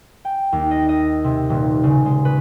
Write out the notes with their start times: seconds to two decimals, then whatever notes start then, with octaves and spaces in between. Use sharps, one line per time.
0.25 G5
0.52 D#2
0.71 D#5
0.89 D#5
1.24 C3
1.50 D#1
1.83 C#3
2.06 G#3
2.25 B4